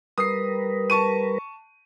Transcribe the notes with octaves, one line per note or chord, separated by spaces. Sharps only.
G3 A#4 B4 D#6 C7
A5 C#6 D#7